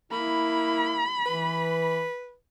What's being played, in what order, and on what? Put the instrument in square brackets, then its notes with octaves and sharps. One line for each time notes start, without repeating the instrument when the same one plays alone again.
[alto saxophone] A#3 [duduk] E4 [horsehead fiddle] B5
[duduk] E3 [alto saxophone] B4